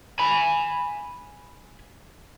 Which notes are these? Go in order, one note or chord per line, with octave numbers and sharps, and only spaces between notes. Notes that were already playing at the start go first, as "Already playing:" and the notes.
G#5 B5